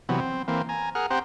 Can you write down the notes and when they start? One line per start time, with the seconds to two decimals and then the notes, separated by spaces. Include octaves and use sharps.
0.09 C3 E3 F#3 B3
0.20 C4
0.48 E3 A#3 C4
0.69 G#5 A#5
0.95 G#4 A#4 F#5 F6
1.10 C4 G4 C5 F#5 A#5